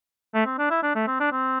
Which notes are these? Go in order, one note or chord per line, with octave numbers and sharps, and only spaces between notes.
A3
C4
D4
E4
D4
A3
C4
D4
C4